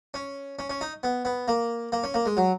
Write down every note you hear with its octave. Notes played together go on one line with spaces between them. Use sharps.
C#4
C#4
C#4
D#4
B3
B3
A#3
A#3
C#4
A#3
G#3
F#3